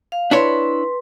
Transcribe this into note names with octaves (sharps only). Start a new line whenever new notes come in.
F5
D4 E4 B4 C#5 C6